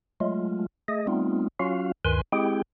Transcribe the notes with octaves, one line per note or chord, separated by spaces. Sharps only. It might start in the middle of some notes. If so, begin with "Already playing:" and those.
F#3 G#3 A3 F4
A3 G#4 D#5
G3 A3 B3 C4 D#4 F4
F#3 C#4 F4 F#4 F5
D2 G2 D#3 B4 G#5 C6
G#3 C4 E4 G4 G#4 G5